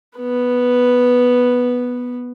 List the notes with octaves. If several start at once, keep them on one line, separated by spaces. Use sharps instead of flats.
B3 B4